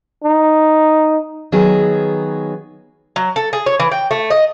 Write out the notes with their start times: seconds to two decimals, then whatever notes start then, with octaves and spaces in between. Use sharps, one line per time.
0.24 D#4
1.52 D#3 F#3 B3 G#4
3.16 F#3
3.36 A4
3.53 G#4
3.66 C#5
3.80 E3
3.92 G5
4.11 A3
4.30 D#5